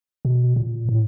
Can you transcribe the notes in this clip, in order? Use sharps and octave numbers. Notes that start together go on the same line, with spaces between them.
B2
A#2
A2